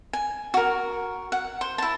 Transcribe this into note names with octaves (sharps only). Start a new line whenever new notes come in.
G#5
F#4 A#4
F#5
C5
E4 A5